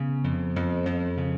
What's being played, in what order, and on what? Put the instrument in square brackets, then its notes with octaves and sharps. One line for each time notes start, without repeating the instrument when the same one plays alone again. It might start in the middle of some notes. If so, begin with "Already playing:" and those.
Already playing: [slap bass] C#3 B3
F2
F2
F2
C#3